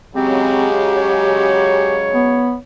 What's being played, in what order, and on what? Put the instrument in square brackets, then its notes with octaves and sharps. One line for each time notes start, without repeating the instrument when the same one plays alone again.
[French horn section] C#3 F#3 G#3 [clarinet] C4 [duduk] G4
[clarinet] C#5
[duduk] B3